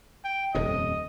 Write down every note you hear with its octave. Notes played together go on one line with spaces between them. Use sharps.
G5
D#1 F2 C3 D#5